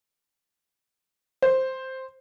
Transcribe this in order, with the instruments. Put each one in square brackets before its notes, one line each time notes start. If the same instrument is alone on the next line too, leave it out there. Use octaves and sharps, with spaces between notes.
[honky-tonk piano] C5